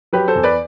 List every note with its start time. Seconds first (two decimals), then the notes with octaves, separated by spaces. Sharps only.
0.13 F#3 G4 B4
0.28 A4 C5
0.36 E2
0.43 B4 D5